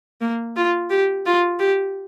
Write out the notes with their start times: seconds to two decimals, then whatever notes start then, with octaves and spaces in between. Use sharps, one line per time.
0.21 A#3
0.57 F4
0.90 G4
1.26 F4
1.59 G4